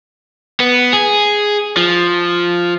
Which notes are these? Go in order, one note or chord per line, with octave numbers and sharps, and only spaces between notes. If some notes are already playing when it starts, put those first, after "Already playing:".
B3
G#4
F3